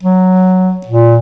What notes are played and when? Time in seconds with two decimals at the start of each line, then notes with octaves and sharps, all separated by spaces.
0.03 F#3
0.87 A#2